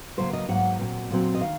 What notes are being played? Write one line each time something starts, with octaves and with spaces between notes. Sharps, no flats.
C#3 F#3 A#3 C5
D#5
G#2 F#3 A#3 F#5
A#2 F#3 C4
A#2 F#3 C4
D#5
D#3 F5